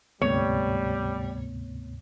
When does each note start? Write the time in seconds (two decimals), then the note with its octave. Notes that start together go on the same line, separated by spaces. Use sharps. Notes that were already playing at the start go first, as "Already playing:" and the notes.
0.22 D2 G#2 C3 G3 A3 B3 C#5